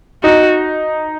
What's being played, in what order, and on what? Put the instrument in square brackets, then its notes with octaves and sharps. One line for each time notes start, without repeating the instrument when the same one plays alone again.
[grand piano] D#4 [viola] F#4